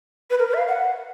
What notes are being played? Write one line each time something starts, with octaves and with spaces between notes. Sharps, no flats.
B4
A#4
B4
E5
F5
F#5